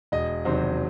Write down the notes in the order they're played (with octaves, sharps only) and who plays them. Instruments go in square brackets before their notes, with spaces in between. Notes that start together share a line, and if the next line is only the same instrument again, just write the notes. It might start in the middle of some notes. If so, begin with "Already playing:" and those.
[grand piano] E1 D#5
E2 C3 D#3 F#3 C5